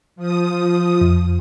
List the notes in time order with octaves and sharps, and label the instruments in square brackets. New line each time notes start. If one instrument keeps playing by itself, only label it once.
[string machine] F3 D#6
[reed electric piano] F2